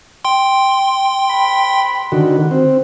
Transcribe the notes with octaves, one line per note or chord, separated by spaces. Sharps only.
G5 C6
B5
D3 D#3 F#4
C4